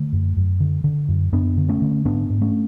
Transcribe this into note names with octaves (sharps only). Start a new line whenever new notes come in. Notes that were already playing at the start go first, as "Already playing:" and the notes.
Already playing: D3 A3
F#2
F#2
D3
D3
F#2
F#2 B3 D4
D3
A3 C#4
D3
G#2 B3 D4
G#2
A3 C#4